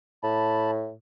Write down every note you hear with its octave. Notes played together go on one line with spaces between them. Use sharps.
A2 A5 B5